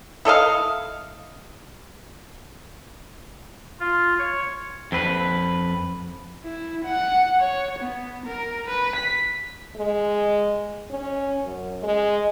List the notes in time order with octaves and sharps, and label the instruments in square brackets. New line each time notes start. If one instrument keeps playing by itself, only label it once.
[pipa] E4 A4 D#5 F5
[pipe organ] F4
C#5
[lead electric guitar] F2 B4
[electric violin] E4
F#5
C#5
B3
A#4
B4
B6
[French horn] G#3
C#4
F#2
G#3